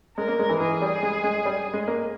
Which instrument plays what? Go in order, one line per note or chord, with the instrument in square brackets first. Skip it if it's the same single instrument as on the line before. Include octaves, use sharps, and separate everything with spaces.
[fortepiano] G#3 [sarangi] A#4
[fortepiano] A#3
G#3
E3
[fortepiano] E3 [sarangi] G#4
[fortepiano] G3
G#3
G#3
G3
G#3
A#3